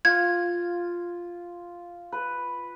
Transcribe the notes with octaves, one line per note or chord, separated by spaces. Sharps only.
F4 G#6
B4